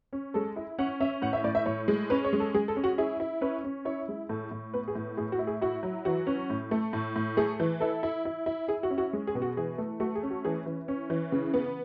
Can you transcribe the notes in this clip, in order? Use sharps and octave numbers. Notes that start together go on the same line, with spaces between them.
C#4
G#3 A4
E4
C#4 F#5
C#4 E5
A2 F#5
E5
A2 D5
E5
A2 C#5
G#3
C#4 B4
C#5
G#3
A4
G#3 G#4
A4
C#4
F#4
E4 G#4
E4
C#4 B4
C#4
E4 C#5
G#3
A2 A4
A2
B3 B4
G#4
A2
A2 G#4
F#4
E4
G#4
E4 F#4
F#3
E3 F#4
C#4
A2
A3
A2
A2
A3 G#4
E3
E4 A4
E4
E4
E4
E4 G#4
F#4
C#4
F#4
G#3
G#4
B2
F#4
E3 G#4
A3
A3 F#4
G#4
C#4
F#4
E3 G#4
E3
C#4
E3
C#3
B3